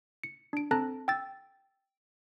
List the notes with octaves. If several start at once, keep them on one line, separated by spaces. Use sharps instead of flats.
C#7
D4 D7
C4 A4 A5 A#5 F#6 A#6
G5 E6 A6